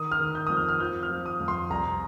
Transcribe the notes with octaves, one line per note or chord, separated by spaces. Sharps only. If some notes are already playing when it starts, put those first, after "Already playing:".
Already playing: D#3 D#6
F6
D#3
G6
F2 D#6
F6
F6
F3 G6
F6
F3
D#6
F2
C6
C2 A#5